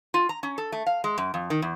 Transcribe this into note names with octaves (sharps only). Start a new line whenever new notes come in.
F4
A#5
C#4
A4
A3
F5
G#3
F#2
F2
D#3
E2